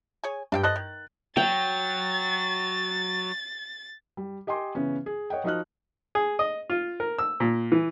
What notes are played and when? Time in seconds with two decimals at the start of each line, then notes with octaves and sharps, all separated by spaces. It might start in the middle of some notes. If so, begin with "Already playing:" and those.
0.24 G#4 C#5 G#5
0.52 G2 D4 F5 G5
0.63 A4 C5 D#5 F#6 A6
0.76 D#3
1.37 F#3 G5 A6
4.17 G3
4.47 G4 D#5 G5 G#5 C6 D6
4.75 C#3 E3 B3 C#4
5.06 G#4
5.30 C#5 D#5 F#5 G5
5.44 F3 D#4 F#4 D#5 F6 F#6
6.15 G#4
6.39 D#5
6.70 F4
7.00 A#4
7.18 E6
7.40 A#2
7.72 E3